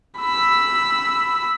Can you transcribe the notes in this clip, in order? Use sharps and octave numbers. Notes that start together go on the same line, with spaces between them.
B5 E6